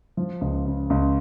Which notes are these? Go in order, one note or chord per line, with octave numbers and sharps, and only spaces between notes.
F3
C#2
C#3
C#2